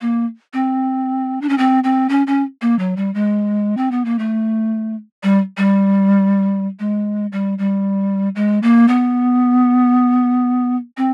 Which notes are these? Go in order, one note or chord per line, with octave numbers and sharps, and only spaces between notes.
A#3
C4
D4
C#4
C4
C4
C#4
C#4
A#3
F#3
G3
G#3
C4
B3
A#3
A3
G3
G3
G#3
G3
G3
G#3
A#3
B3
C4